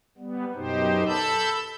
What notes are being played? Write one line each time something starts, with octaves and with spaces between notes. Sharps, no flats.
G3 B3
F#2 B2 D#4 G4 C5
A4 A5 B5 E6 G6